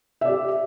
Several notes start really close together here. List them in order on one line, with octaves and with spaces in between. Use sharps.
E5 D5 G4